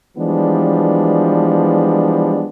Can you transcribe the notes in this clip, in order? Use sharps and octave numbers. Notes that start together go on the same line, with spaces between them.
E3 F3 G3 G#3 B3 D4